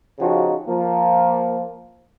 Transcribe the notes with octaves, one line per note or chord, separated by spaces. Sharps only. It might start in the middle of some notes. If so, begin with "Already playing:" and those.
C#3 F3 D#4 F#4 G4
F3 A#3